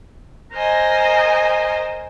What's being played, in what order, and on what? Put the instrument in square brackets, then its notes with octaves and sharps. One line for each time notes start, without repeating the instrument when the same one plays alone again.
[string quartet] A#4 C5 D#5 G#5